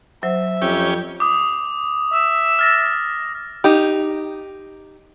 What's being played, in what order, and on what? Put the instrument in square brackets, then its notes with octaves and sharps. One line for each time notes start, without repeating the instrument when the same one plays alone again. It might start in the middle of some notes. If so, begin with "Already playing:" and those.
[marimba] F#3 C5 [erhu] E5
[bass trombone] F2 [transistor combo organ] C#4 G4
[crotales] D6 D#6
[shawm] E5
[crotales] F6 A6 A#6
[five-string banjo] D#4 G4